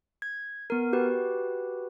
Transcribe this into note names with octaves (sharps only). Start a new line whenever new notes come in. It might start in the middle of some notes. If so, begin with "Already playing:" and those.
G#6
B3 A#4
F#4 G4 B4